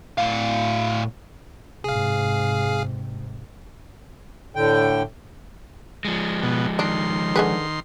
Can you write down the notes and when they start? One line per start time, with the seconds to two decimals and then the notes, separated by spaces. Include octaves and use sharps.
0.18 A2 F5
1.84 G#2 C3 G#4 F5
4.56 A2 D3 G5
6.05 F3 G#3
6.43 B2
6.79 D#3 D4 C6
7.36 D3 G#4 B4